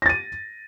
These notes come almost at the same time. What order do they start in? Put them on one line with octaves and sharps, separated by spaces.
A#6 A6 D#7